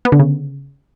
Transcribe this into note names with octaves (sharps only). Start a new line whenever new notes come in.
B3
D3
C#3